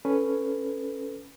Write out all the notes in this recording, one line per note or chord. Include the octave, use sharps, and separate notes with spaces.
C#4 A4 B4